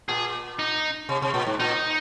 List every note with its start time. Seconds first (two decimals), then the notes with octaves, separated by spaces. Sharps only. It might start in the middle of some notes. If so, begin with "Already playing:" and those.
0.09 A#2 G#4
0.59 D#4
1.09 C3
1.22 C3
1.34 A#2
1.47 G#2
1.60 A#2 D#4